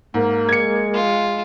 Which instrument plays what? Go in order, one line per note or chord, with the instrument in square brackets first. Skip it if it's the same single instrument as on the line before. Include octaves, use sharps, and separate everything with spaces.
[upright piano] G#2 [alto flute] A#3
[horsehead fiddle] G#3 [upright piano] G#6 C#7
[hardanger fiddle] F4